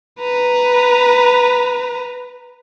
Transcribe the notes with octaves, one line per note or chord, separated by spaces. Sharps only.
B4 A#5